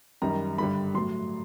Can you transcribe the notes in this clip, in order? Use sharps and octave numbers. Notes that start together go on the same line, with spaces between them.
F#2 D#3 G3 A#5
G2 D3 G3 B5
A2 F#3 C6